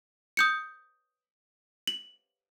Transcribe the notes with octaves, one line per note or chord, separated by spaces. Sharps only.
D#6 G6 C#7
F#7